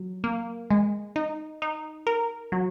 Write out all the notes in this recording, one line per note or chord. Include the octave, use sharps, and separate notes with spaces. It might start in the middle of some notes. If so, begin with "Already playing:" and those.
Already playing: F#3
A#3
G#3
D#4
D#4
A#4
F#3